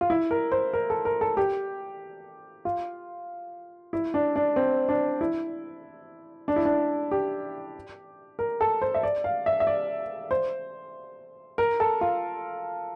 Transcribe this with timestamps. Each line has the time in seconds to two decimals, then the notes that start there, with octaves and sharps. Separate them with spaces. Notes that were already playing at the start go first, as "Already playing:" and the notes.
0.01 F4
0.10 E4
0.31 A#4
0.52 C5
0.73 A#4
0.90 A4
1.05 A#4
1.21 A4
1.37 G4
2.65 F4
3.93 E4
4.14 D4
4.36 D4
4.56 C4
4.89 D4
5.21 E4
6.48 D4
6.56 E4
6.65 D4
7.11 G4
8.39 A#4
8.61 A4
8.82 C5
8.94 E5
9.03 D5
9.24 F5
9.46 E5
9.60 E5
9.67 D5
10.31 C5
11.58 A#4
11.80 A4
12.01 F4